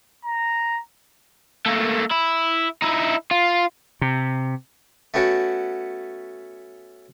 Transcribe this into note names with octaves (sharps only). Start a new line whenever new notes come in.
A#5
A3 A#3
E4
D#4 E4
F4
C3
A3 B3 C#4 F#4 G5 A5